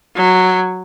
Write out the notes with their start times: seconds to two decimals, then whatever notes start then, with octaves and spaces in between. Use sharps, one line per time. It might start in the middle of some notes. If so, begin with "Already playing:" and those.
0.15 F#3